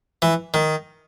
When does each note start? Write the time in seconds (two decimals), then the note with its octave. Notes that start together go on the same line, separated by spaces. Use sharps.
0.22 E3
0.54 D#3